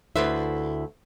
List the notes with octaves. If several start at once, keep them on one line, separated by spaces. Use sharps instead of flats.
D2 E4 A4 B4 C5 E5